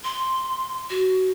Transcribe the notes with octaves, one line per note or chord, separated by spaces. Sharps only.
C6
F#4